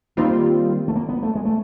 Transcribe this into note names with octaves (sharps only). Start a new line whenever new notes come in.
D#3 G3 A#3 C4 F4
A3
A#3
B3
A3
G#3
A3